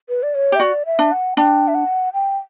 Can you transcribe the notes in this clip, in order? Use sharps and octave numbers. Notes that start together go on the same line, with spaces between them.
B4
D5
C#5
G4
E5
F#4 D5
E5
D4
F#5
D4 G5
E5
F#5
G5